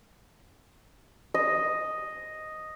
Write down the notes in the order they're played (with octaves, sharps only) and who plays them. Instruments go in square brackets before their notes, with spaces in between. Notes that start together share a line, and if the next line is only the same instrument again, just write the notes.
[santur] D#5